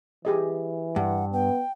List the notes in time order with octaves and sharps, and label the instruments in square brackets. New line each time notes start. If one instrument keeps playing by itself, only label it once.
[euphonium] E3 [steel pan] G4 G#4 D#5
[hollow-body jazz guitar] G2 [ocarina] F#5
[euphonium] B3 [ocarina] G5